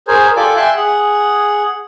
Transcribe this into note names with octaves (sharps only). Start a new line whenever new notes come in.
G#4 A#4 C5 C#5 G#5
F4 G4 A4 D5 G#5 D6
E5 G5 G#5 C6 F#6
G#4 F#5